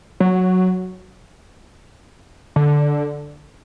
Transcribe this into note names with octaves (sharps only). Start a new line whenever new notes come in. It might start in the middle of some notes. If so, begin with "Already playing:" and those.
F#3
D3